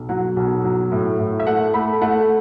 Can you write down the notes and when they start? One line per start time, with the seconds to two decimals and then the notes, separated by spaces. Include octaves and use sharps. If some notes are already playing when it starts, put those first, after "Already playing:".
Already playing: B1
0.09 F#3 F#5
0.36 B1
0.64 F#3
0.92 A2
1.19 A2
1.40 E5
1.47 A3 F#5
1.74 A3 B5
2.02 A3 F#5